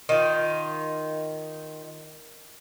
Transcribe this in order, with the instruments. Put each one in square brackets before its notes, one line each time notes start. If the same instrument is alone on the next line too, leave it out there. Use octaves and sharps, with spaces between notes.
[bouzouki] D#3 F4